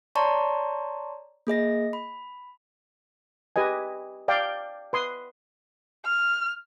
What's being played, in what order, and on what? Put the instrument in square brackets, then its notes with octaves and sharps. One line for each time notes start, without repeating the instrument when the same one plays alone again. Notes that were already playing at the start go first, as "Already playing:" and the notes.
[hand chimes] C#5 D5 A5 A#5 C6 C#6
A#3 G#4 D#5 A#6
B5
[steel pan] G4 B4 D#5 G#5
D5 F5 G5
B4 C6 D#6
[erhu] F6